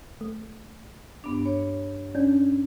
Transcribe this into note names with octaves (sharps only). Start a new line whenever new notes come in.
A3
G2 B3 D4
C#5
C#4 D4